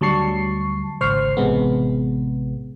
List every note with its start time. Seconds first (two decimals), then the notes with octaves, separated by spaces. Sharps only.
0.01 D2 F#3 G3 A5 C#6 C7
1.00 G#1 C#2 C5 C#6 F6 C7
1.37 A1 C3 G#3 B3